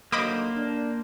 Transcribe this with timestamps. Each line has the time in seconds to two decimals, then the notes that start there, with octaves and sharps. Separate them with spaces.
0.12 D3 D#3 F#3 A#3 C5 D#5 B5 D6
0.56 D4